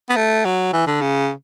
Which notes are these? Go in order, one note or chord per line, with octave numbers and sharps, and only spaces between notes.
B3
A3
F#3
E3
D3
C#3